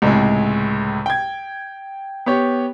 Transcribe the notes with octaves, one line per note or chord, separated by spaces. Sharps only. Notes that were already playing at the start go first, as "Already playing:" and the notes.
C#2 A2 C3 G#3
G5 G#6
B3 G4 C#5